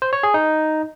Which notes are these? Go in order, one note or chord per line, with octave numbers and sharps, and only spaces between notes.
C5
C#5
G#4
D#4